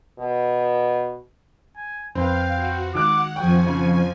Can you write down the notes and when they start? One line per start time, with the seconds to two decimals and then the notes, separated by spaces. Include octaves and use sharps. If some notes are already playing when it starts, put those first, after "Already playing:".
0.19 B2
1.77 G#5
2.15 F2 C4 B4 F5 G5
2.56 F#4
2.95 D#3 G#3 F#5 D6 E6 F#6
3.36 F2 F3 G#4 G5 G#5 C#6
3.67 C#3